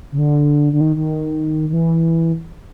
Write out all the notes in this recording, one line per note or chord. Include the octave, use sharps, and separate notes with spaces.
C#3
D3
D3
D#3
D#3
D#3
E3